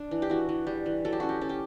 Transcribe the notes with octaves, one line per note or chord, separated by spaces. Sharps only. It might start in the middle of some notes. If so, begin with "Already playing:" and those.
Already playing: D4
E3
G4
E3 F#4
E3
G3
E3
F#3 A4
G4
C#4 F#4
G4
C#4 A4
G4